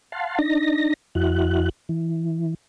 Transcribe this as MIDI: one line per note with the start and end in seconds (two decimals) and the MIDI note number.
0.12 0.39 77
0.12 0.39 78
0.12 0.39 81
0.12 0.39 84
0.39 0.94 62
0.39 0.94 63
0.39 0.94 94
1.15 1.69 41
1.15 1.69 64
1.15 1.69 66
1.15 1.69 90
1.89 2.54 52